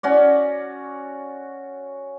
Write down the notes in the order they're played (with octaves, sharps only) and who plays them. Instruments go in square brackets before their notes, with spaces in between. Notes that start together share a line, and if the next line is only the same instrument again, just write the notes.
[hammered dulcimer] C#4 F#4 D5